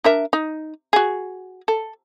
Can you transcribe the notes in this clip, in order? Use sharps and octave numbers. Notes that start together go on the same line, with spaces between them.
D4 A#4 E5
D#4
F#4 G#4
A4